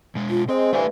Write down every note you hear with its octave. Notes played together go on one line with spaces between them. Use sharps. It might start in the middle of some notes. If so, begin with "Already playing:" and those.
B2 G#3
F4
G#3 C4 C5
G2 D3 E3 A3 G#5